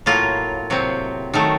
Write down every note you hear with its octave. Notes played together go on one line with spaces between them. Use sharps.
A2 F#3 A#3 F4
C3 F#3 C4
D#3 F#3 A3